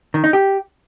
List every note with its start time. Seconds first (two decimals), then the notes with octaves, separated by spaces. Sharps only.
0.14 D#3
0.24 D#4
0.33 G4